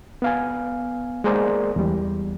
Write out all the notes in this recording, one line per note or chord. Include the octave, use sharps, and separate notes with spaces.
B3 F5 G#5
G#3 A#3 G#4 A#4 C5 D5
E2 G3